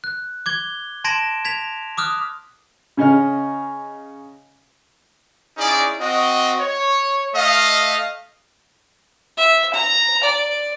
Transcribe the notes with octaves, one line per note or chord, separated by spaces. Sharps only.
F#6
D6 G#6 G7
A5 C6 G#6 A#6 D7 E7
G#6 B6 F7
D6 D#6 F6 F#6
C#3 C#4 D#5 F6
C#4 D#4 E4 G#4 D5
C4 F#4 D#5
C#5
A3 D#5 F5
E5
A#5
D5